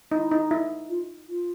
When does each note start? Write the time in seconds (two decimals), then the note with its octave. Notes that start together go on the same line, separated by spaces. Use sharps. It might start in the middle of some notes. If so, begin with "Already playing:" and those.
0.12 D#4 E4
0.31 D#4
0.51 E4
0.89 F4
1.29 F4